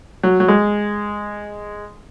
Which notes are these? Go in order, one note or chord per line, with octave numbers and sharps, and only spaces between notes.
F#3
F#3
G#3